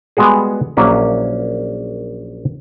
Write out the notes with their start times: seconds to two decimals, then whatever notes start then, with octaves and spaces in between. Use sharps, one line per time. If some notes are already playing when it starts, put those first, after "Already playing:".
0.17 G3 G#3 B3 F#4 G#4
0.77 A#1 F#3 A#3 C#4 E4